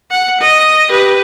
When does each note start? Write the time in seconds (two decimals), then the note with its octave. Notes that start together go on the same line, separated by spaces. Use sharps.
0.11 F#5
0.40 D#5
0.89 G4 B4